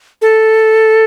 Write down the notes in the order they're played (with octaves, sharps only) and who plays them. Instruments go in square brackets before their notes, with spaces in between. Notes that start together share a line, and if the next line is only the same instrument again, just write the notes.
[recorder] A4